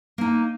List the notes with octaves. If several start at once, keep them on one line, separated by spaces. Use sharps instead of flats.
A#3 D#4